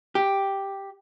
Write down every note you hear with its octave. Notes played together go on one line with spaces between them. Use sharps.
G4